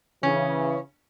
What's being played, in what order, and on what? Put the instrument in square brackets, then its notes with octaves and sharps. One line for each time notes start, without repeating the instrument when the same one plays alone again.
[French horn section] C#3 E3 [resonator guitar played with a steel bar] C#4